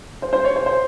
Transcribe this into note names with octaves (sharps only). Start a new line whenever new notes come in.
C5
C5
C#5
C5
C5